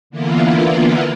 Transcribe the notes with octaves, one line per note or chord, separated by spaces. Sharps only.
D3 E3 A#3 B3 E4 F4